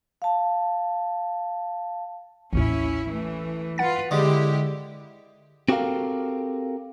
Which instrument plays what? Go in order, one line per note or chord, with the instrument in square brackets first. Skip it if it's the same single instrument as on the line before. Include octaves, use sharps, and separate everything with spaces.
[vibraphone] F5 A5
[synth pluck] A1 D#2 A2 [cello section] C#4 E4
[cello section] E3 A3
[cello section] F4 B4 [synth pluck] F#5 A6
[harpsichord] D3 G#3 [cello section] E4 G4
[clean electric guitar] C4 F#4 G4 A4 A#4 F5